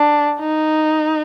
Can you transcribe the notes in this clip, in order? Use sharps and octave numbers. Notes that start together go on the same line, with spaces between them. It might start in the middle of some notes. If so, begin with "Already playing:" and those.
Already playing: D4
D#4